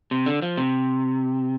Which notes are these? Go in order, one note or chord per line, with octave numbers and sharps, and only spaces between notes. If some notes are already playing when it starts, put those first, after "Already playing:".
C3
D3
F3
C3